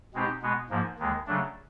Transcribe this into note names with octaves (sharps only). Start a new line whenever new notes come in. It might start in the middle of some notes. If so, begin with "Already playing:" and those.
B2 G#3 C4 D#4 G4
B2 G#3 B3
G#2 F3 A#3
D#2 D#3 G#3
C#3 F#3 A3 D4